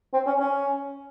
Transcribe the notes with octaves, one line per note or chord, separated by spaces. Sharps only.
C4
C#4
C#4